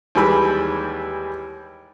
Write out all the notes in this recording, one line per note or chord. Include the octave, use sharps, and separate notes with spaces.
D#2 E3 G3 G#3 B5 E6